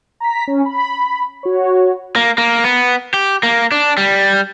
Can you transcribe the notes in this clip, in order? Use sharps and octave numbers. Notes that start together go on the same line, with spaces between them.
A#5 B6
C#4
B5
F#4 C#5
A#3
A#3
B3
G4
A#3
D4
G3